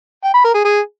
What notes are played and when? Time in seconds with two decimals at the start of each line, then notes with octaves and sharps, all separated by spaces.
0.24 G5
0.34 B5
0.44 A#4
0.55 G#4
0.65 G#4